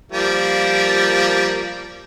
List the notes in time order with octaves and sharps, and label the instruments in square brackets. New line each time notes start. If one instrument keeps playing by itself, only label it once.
[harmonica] F3 G3 A#3